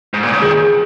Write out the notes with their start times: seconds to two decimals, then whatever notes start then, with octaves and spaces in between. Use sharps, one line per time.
0.14 G#2
0.23 A#2
0.32 C#3
0.41 D#3 G#4